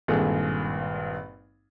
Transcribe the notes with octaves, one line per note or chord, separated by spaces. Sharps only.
G#1 G2 A#2 G#4 A4